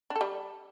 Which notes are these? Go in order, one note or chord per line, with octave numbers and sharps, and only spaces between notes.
D4
A4
G3